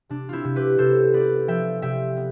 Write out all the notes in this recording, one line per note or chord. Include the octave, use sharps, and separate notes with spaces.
C3 D4
C4 E4 F4
C3
G4 B4
C3 A4 C5
B3 B4 D5
F3 E5 G5
C3 E5 G5
B3